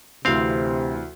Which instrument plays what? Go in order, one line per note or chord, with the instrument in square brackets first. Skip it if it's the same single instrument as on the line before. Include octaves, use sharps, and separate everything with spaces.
[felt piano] D2 E3 [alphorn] C3 [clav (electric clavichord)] C4 F5